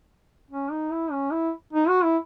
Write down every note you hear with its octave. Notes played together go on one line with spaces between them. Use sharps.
C#4
D#4
E4
C#4
E4
D#4
F#4
E4